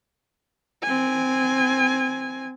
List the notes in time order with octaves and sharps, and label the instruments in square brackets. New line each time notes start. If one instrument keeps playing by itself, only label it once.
[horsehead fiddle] C4 G#5